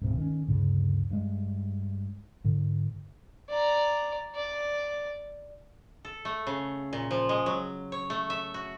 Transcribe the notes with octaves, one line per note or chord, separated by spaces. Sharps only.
D1 G#2 C3
D#3 C#4
D2 G2 C#3
G2 G#3
G#2 D3
D5 A#5
D5
A4
A3
C#3
A#2
F3
G#3
F#3
C#5
A3
E5
F#4